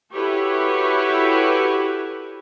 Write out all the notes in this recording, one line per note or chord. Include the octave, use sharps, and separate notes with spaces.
E4 F#4 G4 A4 B4 C#5